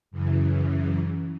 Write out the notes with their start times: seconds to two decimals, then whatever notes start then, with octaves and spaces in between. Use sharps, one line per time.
0.11 F#2 C#3 E3